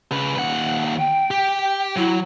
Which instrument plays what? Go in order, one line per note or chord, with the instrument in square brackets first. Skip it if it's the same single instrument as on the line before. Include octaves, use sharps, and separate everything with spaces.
[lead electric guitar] C#3 B4
D#2 F#5
[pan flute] G5
[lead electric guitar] G4
[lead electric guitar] F#3 [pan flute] E4